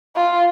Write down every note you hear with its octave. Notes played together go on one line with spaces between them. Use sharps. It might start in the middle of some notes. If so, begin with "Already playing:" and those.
F4